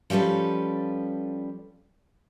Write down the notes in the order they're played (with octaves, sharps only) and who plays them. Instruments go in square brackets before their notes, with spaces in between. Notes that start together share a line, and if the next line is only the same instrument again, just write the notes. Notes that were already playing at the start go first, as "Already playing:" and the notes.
[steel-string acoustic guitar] F3 G3 C#4 A4 B4